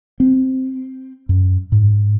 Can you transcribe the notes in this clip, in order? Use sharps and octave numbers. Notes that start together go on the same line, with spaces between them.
C4
F#2
G#2